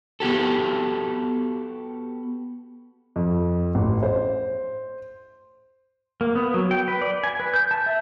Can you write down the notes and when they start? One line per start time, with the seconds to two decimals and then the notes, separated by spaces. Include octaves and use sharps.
0.20 B3 F#4 G4 A4
3.16 F2
3.75 A1
4.03 C5
6.21 A#3
6.35 B3
6.54 F#3
6.71 G5
6.88 B4
7.02 D5
7.24 G#5
7.40 B4
7.54 G6
7.71 A5
7.86 E5